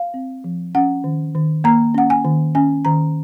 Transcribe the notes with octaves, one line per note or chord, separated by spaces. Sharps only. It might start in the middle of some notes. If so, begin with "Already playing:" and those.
Already playing: F5
C4
F3
C#4 F#5
D#3
D#3
A#3 A#5
C#4 F#5
G#5
D#3
C#4 G#5
D#3 A#5